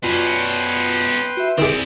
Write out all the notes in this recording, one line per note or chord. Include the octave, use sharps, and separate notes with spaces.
F#2 B2 C#4 F4 B4 D5 G5 C6
F#4 E5
D#3 C4 E4 G#4 D5